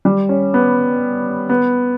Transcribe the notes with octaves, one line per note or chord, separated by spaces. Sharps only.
G3
C#4
B3
B3